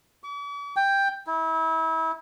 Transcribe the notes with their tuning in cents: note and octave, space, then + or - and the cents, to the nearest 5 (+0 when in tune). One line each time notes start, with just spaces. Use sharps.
D6 -45
G5 +10
E4 -30